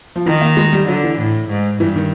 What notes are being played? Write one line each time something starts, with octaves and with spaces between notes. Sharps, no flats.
F3
D#3 E3
A#3
G#3
G3
D3 F#3
E3
A2
G#2
G2 E3
D#3